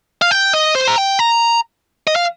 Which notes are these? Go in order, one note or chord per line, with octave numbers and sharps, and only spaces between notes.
F5
G5
D#5
C5
A#5
G5
A#5
D#5
F5